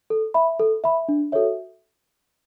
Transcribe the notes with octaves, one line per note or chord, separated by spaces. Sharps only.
A4
E5 B5
A4
E5 B5
D4
F#4 A4 C#5 E5